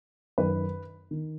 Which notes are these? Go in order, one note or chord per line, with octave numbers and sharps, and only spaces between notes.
F#2 D#3 B4
D#3